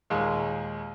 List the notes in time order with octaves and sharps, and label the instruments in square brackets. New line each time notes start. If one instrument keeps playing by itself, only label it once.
[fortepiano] D#2 A#2 G#3